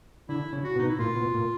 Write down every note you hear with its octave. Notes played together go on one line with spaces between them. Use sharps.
D3 E4
C#3
F#4
B2
D#4
E4
A#2 F4
B2
A#2